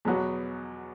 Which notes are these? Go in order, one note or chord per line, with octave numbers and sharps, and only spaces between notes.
E2 B2 F#3 B3 F#4